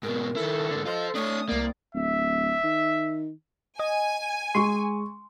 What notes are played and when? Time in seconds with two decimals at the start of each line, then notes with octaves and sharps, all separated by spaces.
0.03 G#2 B2 A#4
0.36 D#3 E4 A4
0.71 G#2 D3
0.86 F4 C5 D#5
1.15 A3 D4 C#5 D#6
1.49 C2 A#3 D5
1.95 D1 E5
2.64 D#3
3.80 D#5 G#5
4.55 G#3 C6 C#6